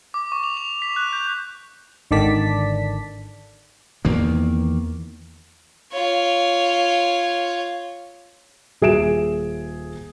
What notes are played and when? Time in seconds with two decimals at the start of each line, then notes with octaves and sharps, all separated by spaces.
0.14 D6
0.32 C#6
0.44 F7
0.57 F7
0.82 B6
0.96 F#6
1.13 G6
2.11 G#1 D3 D#3 D5 A5 B6
4.05 E2 D#3 A#3
5.92 F4 C#5
8.82 D#1 G#4 E5 D7 E7